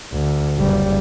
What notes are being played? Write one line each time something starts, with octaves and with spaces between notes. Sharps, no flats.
D2
F#1 G3